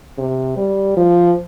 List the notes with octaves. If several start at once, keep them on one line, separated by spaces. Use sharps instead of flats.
C3
G3
F3